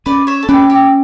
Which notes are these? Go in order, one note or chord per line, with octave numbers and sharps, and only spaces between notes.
C#4 B4 D5
C#5 E5
A4
C#4 G4 B4
G4